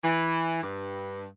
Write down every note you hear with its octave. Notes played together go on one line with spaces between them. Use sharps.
E3
G2